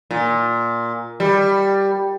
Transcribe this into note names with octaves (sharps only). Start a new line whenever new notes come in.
A#2
G3